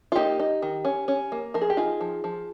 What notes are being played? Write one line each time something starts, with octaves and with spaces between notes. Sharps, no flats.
F4
A#3 D#4 G4
D#4
D#3
C#4
C#4
A#3
F3 A#4
G#4
G4
D#4 F4 G#4
F3
F3